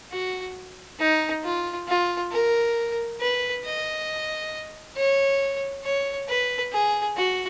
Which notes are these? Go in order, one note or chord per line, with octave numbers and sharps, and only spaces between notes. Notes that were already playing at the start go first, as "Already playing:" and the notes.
F#4
D#4
F4
F4
A#4
B4
D#5
C#5
C#5
B4
G#4
F#4